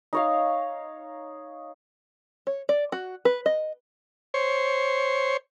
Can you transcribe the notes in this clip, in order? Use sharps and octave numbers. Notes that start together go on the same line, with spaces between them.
D#4 C#5 F5
C#5
D5
F#4
B4
D#5
C5 C#5